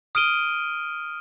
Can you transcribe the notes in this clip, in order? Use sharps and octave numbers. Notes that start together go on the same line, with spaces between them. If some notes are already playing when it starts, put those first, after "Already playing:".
D#6 F6 D7 D#7 G7